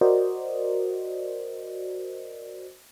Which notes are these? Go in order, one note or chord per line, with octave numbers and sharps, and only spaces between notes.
F#4 A#4 C5 D5 D#5